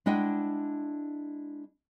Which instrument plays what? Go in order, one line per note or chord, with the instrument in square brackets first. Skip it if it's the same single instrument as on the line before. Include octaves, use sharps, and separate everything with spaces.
[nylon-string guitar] G#3 D4 E4 D#5 F#5 G5